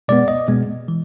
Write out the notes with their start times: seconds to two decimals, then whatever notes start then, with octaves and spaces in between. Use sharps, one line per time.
0.08 B2 G#3 B3 D5
0.28 D#5
0.48 B2 G#3 B3
0.88 E3